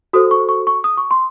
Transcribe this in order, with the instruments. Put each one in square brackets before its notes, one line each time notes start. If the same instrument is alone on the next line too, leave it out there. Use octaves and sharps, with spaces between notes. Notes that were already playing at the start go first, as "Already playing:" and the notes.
[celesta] F#4 A4 C5 D#6
C#6
C#6
C#6
D#6
C#6
C6